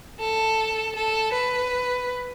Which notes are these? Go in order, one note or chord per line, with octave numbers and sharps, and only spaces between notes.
A4
A4
B4